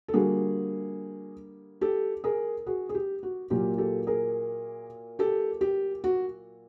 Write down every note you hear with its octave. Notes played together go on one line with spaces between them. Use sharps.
A4
D3 G3 A#3 F#4 G#4
G4 A4
G#4 A#4
F#4 G#4
G#4
G4
F#4
A#2 F#3 A#3 G4
G4 A4
G#4 A#4
G4 A4
G4
F#4